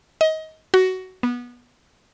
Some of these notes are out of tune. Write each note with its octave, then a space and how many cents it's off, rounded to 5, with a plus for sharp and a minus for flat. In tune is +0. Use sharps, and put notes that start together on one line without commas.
D#5 +25
F#4 +15
B3 -20